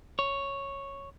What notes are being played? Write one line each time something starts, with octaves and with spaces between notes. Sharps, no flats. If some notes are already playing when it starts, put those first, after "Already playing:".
C#5